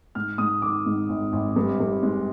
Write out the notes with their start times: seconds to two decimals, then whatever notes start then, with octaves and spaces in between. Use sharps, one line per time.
0.15 G#2 F6
0.38 G#2 D#6
0.62 D#3 D6
0.86 G#2
1.09 G#1
1.33 G#1
1.56 G2
1.80 G2
2.03 G#3